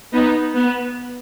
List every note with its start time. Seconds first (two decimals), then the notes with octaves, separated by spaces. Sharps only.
0.13 B3 D#4
0.55 B3